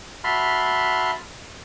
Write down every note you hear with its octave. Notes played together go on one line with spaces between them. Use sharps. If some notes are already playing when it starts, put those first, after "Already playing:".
F#4 E5 A5 B5 C6 F6